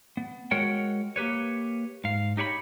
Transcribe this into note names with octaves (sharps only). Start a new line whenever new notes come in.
B3
G#3 F#4 A#4 C#5 F#5 G5
A#3 G4 B4 C#5
G#2 F5
D#4 G4 C#5 F5 B5